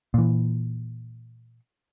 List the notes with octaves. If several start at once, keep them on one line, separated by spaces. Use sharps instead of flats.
A#2 E3